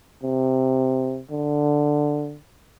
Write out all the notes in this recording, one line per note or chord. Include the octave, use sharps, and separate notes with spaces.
C3
D3